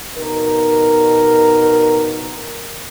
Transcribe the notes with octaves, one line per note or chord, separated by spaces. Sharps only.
B2 D#4 A#4